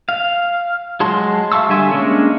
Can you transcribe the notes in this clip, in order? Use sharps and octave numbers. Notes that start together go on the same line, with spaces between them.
F5
F#3 G#3 A5 C6
E5 F5 A5 C#6 E6
D3 G3 E5 G#5 C6
G#3 A#3 C#4 D4 C#5